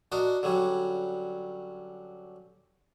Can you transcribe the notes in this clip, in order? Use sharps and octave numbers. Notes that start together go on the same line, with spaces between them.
D4 F#4 A#4 D#5
D3 F#3 G3 C#4